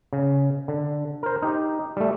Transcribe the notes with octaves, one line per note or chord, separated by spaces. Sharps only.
C#3
D3
A#4 C5
D#4 G4
G3 A3